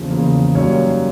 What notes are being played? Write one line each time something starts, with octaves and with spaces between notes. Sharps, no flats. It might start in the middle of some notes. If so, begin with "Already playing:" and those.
Already playing: E2 C#3 F3 A#3
E2 C#3 F3 A#3
F#2 D#3 G3 A#3 C#5